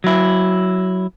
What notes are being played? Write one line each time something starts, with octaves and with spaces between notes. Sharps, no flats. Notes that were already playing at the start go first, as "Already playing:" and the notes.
F#3 E4